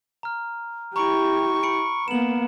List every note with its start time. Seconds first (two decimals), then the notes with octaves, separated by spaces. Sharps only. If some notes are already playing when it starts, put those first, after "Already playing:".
0.23 A#5 F6
0.96 E4 G4 A#5 B5 C#6 D7
1.63 B5 C#7 D7
2.08 A#3 B3 E7 F#7